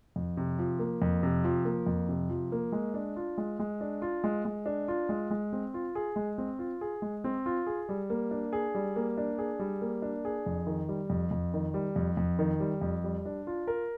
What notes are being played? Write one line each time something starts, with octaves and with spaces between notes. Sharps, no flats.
F2
C3
F3
A#3
F2
C3
F3
A#3
F2
C3
F3
A#3
G#3
D4
F4
G#3
G#3
D4
F4
G#3
G#3
D4
F4
G#3
G#3
C4
F4
G#4
G#3
C4
F4
G#4
G#3
C4
F4
G#4
G3
A#3
D4
G#4
G3
A#3
D4
G#4
G3
A#3
D4
G#4
F2
D#3
G3
F2
F2
D#3
G3
F2
F2
D#3
G3
F2
G3
D4
F4
A#4